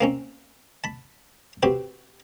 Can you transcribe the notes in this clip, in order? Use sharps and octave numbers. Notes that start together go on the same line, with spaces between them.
A#3 C4 C#4
A5 B5
C4 F#4 G4 B4